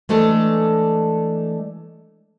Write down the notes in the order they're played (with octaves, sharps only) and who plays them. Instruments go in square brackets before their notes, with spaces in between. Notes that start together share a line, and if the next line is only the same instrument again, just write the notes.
[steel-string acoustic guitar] E3 G#3 A3 D4 A4